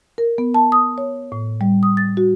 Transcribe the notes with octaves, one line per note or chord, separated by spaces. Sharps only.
A#4
B3
A5
D#6
C#5
A2
G3
D#6
A6
F#4